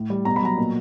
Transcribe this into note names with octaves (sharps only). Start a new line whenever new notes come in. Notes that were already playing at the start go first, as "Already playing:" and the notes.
Already playing: A2
G3
B2 A#5
B5
F#3 A#5
A#2